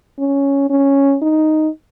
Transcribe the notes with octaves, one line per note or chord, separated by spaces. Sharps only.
C#4
C#4
D#4